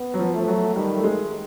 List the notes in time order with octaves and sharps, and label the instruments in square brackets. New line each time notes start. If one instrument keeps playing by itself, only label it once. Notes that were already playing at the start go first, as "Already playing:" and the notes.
Already playing: [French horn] B3
[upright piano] F#3
F3
[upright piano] F3 [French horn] A3
[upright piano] F#3
[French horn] D#3 [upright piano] G3
[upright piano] A3
G#3